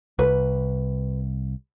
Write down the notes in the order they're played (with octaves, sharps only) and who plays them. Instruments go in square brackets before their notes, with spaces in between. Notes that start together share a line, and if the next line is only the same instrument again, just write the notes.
[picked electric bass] C2 [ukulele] B4